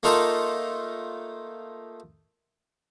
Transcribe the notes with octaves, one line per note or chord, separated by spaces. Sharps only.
A3 A#3 D#4 F4 A4 A#4